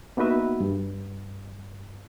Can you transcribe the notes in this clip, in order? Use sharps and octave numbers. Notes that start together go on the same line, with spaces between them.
A#3 B3 D#4 F#4 B4 E5
G2